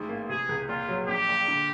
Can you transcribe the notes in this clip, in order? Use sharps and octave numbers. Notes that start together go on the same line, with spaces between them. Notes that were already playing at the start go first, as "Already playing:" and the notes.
Already playing: A1 G#2
A#3
C3 G#4
C#2
A#2 F4
F#3
A#1 G4
A#2
D3